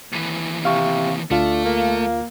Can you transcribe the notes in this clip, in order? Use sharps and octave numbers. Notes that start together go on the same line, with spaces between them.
D#2 E3
C3 F5 C#6
D2 A3 D4 F4 F5
A#3